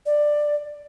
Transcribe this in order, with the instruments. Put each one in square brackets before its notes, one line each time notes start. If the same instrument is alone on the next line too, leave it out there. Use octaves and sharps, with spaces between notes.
[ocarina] D5